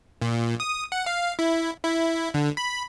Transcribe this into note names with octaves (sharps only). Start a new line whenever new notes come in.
A#2
D#6
F#5
F5
E4
E4
D3
B5